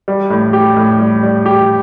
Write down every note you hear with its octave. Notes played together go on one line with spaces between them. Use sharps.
G3
A2
G4
A2
G3
G3
G4